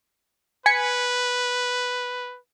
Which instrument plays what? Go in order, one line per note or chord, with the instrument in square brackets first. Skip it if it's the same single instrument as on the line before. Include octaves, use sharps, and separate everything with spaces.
[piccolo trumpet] B4 [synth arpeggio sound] G#5 B6 C#7